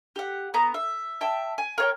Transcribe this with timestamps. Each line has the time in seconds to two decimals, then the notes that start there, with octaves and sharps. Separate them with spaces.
0.16 G4 F#5
0.54 B3 A#5
0.74 E5
1.21 E5 G5 A5
1.58 G#5
1.78 A#4 C#5 G5